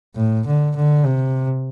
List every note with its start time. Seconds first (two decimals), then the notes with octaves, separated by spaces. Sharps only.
0.16 A2
0.47 D3
0.76 D3
1.06 C3